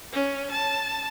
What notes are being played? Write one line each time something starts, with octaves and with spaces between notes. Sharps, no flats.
C#4
A5